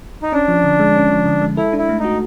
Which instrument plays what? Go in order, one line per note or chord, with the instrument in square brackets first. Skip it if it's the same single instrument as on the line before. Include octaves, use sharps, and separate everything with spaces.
[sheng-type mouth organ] D#4
[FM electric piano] C#4 [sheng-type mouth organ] D4
[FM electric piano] F3
D3
G#3
C#4
F3
D3
G#3
[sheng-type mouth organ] E4 [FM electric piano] A4
[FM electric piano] D4
[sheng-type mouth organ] E4
[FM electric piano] A3
[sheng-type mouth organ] D#4
[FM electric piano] F#4